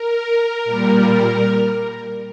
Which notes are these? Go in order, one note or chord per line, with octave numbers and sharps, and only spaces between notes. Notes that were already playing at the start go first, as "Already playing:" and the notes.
Already playing: A#4
A#2 G3